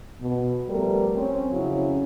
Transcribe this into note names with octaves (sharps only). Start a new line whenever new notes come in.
B2
F3 G3 A3 B3 A#4
C4 C#4
F2 C#3 F#3 C#4 E4